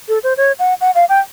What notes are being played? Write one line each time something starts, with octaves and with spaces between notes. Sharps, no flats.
A4
C5
C#5
F#5
F#5
F5
G5